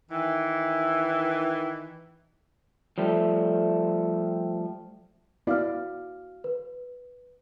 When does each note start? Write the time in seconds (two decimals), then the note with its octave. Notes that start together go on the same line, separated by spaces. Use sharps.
0.10 D#3 E3
2.98 F3 G3 A3
5.47 B3 E4 F#4 D5 F5 F6
6.44 B4